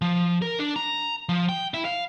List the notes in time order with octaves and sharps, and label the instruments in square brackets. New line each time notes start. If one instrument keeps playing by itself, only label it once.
[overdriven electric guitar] F3
A#4
D4
A#5
F3
G5
E4
F5